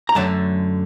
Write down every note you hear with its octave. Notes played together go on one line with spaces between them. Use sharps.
A#5
F#2 D3 F#3 A3 A5